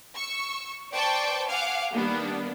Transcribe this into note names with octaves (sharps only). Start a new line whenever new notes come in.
C#6 E6
B4 C5 D5 G5 A5 C#6
F5 F#5 G#5 D6 F6
D#3 G3 A#3 B3 D4